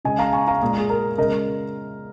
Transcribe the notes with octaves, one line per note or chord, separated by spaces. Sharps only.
C#3 G#3 D#5 G#5
F5 A#5
G#5 C#6
F5 A#5
A#2 G#3 G#4
G#4
A#4
C#3 G#3 A#4 D#5